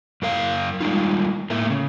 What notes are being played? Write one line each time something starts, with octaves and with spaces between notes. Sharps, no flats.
F#2 A#4 F5
G3 G#3 D#4 F4
A2 A3 A#3
C#3